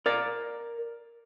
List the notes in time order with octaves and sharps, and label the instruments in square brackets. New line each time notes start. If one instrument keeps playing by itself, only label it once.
[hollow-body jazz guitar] A#4 D5